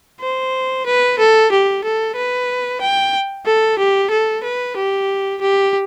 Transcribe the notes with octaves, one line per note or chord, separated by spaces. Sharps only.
C5
B4
A4
G4
A4
B4
G5
A4
G4
A4
B4
G4
G4